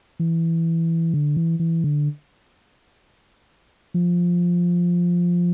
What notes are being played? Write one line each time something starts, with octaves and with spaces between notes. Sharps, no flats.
E3
D3
E3
E3
D3
F3